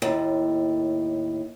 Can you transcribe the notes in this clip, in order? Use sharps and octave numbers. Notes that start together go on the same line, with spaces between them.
D#2 A2